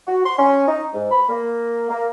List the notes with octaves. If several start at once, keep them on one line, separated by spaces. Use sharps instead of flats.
F#4
C6
C#4
D#4
G#2
B5
A#3
A#3